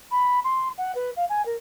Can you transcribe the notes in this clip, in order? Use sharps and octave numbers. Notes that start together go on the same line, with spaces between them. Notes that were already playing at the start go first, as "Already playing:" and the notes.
B5
C6
F#5
B4
F5
G#5
A#4